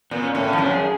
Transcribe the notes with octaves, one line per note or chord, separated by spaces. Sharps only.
A#2 B3
C#4
A2 C#4
C#4
F3
F#2 D4
G#4